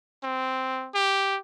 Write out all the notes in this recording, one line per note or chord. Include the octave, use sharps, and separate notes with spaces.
C4
G4